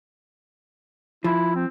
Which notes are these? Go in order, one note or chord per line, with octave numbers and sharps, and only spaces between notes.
F3 E4
C4